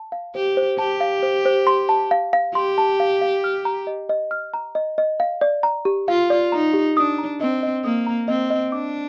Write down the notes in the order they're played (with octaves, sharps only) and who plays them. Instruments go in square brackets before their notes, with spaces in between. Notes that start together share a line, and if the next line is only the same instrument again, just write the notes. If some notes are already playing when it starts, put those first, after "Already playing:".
Already playing: [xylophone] A5
F5
[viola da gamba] G4 [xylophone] C5
[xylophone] C5
[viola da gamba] G4 [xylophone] A5
[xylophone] F5
C5
C5
C6
A5
F5
F5
[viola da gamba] G4 [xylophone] C6
[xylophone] A5
F5
F5
F6
A#5
D#5
D#5
F6
A#5
D#5
D#5
F5
D5
A#5
G4
[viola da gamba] F4 [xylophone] F5
[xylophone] D5
[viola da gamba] D#4 [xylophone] A#5
[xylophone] G4
[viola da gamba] D4 [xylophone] D#6
[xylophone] A#5
[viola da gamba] C4 [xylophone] D#5
[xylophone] D#5
[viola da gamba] A#3 [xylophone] D#6
[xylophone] A#5
[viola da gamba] C4 [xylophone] D#5
[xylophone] D#5
[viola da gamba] D4 [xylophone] D6